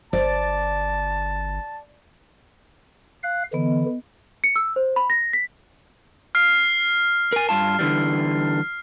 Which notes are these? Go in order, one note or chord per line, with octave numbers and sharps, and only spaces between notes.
G1 C5 D5 A5
F5 F#6
D3 E3 B3 D#5
C#7
E6
C5
B5
A#6
B6
F6 C7
A#4 G#5
G2 F4 A5
D3 E3 G3